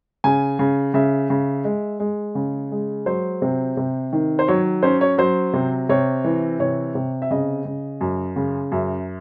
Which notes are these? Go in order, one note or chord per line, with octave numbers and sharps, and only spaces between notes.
C#3 G#5
C#3
C#3 E5
C#3
G#3
G#3
C#3
G#3
F#3 C5
C3
C3
D#3
C5
F#3 C#5
C#4 C5
C#5
F#3 C5
C3
C3 C#5
E3
C3 C#5
C3
E5
C#3 D#5
C#3
F#2
C#3
F#2 E5